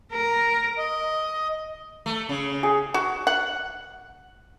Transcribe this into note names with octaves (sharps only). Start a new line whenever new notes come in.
A#4
D#5
A3
C#3
G#4
F#4
F#5